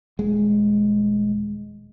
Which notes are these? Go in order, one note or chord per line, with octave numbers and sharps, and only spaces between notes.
D#1 G#3